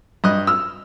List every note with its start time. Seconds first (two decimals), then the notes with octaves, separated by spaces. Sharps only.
0.24 G2 D#5 F#6
0.47 E6 F6